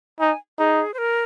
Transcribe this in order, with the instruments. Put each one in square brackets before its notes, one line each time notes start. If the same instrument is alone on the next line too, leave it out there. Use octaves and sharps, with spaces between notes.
[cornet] D#4 [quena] G#5
[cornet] D#4 [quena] G#4
[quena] C5
A#4